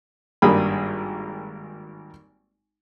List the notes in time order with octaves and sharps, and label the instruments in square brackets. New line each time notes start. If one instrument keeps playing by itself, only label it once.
[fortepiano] G#1 G2 A#3 G4 G#4 B5